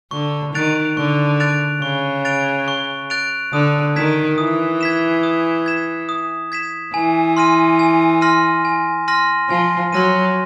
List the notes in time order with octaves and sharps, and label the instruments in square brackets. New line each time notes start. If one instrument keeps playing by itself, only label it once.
[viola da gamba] D3 [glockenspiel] C#6
[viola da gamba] D#3 [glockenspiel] F#6 A6 D7 F7
[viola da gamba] D3 [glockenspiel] C#6
[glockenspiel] F#6 A6 D7 F7
[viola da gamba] C#3 [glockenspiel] C#6
[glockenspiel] F#6 A6 D7 F7
C#6
F#6 A6 D7 F7
[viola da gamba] D3 [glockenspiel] D#6
[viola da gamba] D#3 [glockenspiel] G#6 B6 E7
[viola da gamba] E3 [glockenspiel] D#6
[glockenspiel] G#6 B6 E7
D#6
G#6 B6 E7
D#6
G#6 B6 E7
[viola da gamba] E3 [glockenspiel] G#5
[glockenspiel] C6 F6 A#6 D#7
G#5
C6 F6 A#6 D#7
G#5
C6 F6 A#6 D#7
[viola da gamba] F3 [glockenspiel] G#5
[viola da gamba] F#3 [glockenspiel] C6 F6 A#6 D#7